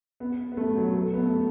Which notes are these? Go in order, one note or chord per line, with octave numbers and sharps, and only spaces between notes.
B3
B3
A3
F#3
A3
B3
A3